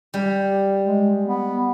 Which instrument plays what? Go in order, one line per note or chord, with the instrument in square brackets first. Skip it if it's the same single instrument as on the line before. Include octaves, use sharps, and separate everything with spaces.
[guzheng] G3
[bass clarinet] G#3
B3